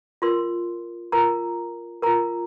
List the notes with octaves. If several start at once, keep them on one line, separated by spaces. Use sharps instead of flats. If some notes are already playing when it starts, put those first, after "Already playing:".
F4 A#4 C6
F4 A#4 A#5
F4 A#4 A#5